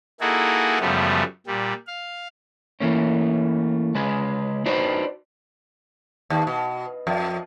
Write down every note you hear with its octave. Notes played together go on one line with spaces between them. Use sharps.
A#3 D#4 E4 F#4 G#4 A4
F#2 C#3 F3 G3 A3 B3
A#2 G3
F5
E3 A3 A#3 C#4
C#3 G#3 B4
D4 D#4 F#4 B4 C5 D5
D#2
B2
F2